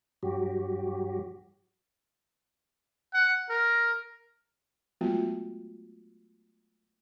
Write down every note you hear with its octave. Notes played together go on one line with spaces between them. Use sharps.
G2 F#3 F#4 G4
F#5
A#4
F#3 G#3 A3 B3 F4 F#4